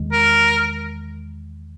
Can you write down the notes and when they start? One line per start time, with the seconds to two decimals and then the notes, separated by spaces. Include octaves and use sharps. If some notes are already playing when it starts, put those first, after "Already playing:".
Already playing: E2 D#3 G#3
0.12 A#4